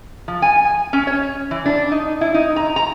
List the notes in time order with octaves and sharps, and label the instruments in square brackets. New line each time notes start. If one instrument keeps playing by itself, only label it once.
[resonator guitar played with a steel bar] F3
G#5
G#5
C#4
C#5
E3
D4
D#4
E4
D#4
A#5
A#5